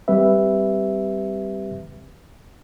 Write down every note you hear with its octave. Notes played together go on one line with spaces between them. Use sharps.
G3 C4 G4 B4 E5